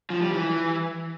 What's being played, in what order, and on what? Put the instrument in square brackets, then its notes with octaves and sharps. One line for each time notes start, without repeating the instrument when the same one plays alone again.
[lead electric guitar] F3
G3
E3